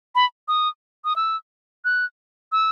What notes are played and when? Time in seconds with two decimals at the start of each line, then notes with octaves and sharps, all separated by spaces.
0.15 B5
0.48 D#6
1.05 D#6
1.16 E6
1.85 F#6
2.52 E6